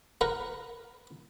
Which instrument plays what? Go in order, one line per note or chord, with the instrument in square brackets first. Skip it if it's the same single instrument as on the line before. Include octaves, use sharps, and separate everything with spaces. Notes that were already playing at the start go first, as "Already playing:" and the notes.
[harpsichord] A#4 B4 F#5